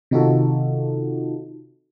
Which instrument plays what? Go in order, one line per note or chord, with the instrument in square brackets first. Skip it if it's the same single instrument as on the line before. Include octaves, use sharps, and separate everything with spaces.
[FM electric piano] C3 D#3 D#4 F4 F#4 A4